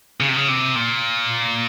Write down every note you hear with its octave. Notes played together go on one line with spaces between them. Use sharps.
C#3
C3
C#3
C3
A#2